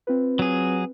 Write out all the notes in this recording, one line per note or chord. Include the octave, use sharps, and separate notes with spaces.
C4 F4 B4
F#3 G#4